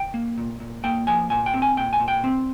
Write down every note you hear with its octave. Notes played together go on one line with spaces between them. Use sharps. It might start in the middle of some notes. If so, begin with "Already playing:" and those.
Already playing: G5
A#3
A#2
A#2
A#3 G5
F3 G#5
A#2 G#5
G5
C4
G#5
A#2 G5
G#5
A#2
G5
C4